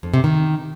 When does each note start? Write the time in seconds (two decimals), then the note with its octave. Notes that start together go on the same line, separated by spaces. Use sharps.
0.03 F2
0.14 C3
0.24 D#3